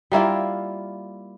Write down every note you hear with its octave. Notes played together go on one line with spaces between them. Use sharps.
G3 A#3 E4 F4